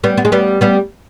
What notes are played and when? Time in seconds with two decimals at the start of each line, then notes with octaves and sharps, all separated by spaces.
0.03 G3 B3
0.17 B3
0.25 G#3
0.32 G3 B3
0.61 G3 B3